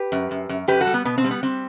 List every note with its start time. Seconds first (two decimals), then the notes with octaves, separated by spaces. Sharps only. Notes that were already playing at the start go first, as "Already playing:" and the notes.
Already playing: G4 B4
0.12 F#2
0.31 F#2
0.49 F#2
0.68 F#2 G4 B4
0.81 F#4 A4
0.87 G3
0.94 B3
1.05 B2 B3
1.18 C4
1.24 G3
1.31 B3
1.43 G3 C4